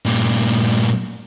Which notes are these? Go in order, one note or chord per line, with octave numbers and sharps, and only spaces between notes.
G2 A#2